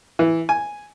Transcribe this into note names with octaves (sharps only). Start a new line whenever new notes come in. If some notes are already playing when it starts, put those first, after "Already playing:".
E3
G#5